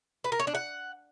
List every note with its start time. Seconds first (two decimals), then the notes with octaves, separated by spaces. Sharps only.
0.24 B4
0.32 A#4
0.39 C#5
0.47 D4
0.55 F#5